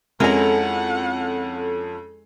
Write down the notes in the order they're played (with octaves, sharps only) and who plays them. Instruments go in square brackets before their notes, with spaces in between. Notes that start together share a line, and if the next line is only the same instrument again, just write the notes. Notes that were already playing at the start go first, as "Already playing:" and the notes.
[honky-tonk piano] F2 C#4 [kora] G#3 E4 A#4 [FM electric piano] A4 [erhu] F#5